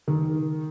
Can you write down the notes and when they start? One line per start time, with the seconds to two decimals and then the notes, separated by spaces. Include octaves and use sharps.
0.08 D#3